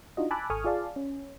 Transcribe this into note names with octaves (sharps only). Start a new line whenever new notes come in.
D4 D#4 F4 F#4 D#5
G#5 A5 B5 D6 E6 F#6
G#1 A4 G#5 C#6 D#6 F6
F4 G#4 D5 F5 A5
C#4